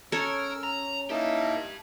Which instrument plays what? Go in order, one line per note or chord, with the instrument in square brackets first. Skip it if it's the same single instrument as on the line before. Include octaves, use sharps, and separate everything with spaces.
[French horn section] C#4 [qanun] A4 C#5 [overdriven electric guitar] A#4 [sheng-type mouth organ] E6 F6
[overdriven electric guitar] A#5
[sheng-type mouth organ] A#3 D#4 E4 [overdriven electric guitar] G4 A5